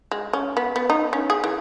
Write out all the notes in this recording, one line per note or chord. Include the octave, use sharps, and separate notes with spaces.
G#3
C#4
B3
B3
D#4
C#4
G#4
E3